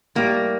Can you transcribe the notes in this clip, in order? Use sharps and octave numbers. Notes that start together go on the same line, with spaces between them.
A2 G3 A#3